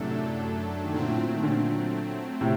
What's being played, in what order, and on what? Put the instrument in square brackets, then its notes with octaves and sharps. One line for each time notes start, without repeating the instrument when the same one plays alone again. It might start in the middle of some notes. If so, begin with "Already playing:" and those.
Already playing: [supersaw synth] F#2 F#3 A3 D4 A4 [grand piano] A2 C3
[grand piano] D#3
[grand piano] A#2 D3 [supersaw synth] F#3 A3 C4
[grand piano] A2
A#2
D#3
A#2 D3
A2 C3